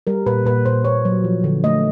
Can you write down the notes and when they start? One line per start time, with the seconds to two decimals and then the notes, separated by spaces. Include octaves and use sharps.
0.07 G3 A#4
0.26 A#2 B4
0.45 A#2 B4
0.65 A#2 C5
0.85 A#3 C#5
1.05 F#3
1.24 F3
1.44 D3
1.64 A3 D#5